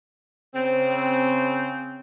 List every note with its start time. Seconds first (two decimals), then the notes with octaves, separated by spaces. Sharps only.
0.53 C#3 C4